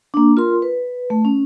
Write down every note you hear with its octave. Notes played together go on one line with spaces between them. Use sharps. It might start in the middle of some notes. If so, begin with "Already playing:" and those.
A#3 D4
F4 A#4 C6
B4
A3
C#4